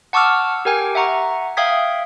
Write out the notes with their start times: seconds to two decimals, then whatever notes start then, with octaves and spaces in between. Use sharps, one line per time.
0.13 F#5 A5 C#6 D6 E6 F6
0.65 G4 A#4 G5 G#5
0.95 E5 F#5 A#5 C#6
1.57 E5 F5 G5 D#6 G#6 B6